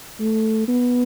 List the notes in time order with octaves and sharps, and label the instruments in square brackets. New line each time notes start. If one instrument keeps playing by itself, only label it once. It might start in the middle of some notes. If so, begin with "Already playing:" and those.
[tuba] A3
B3